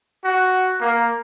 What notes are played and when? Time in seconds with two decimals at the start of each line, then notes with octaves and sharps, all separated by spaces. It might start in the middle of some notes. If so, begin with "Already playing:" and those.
0.24 F#4
0.81 A#3